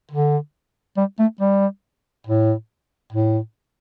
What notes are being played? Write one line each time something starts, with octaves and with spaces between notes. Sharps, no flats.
D3
G3
A3
G3
A2
A2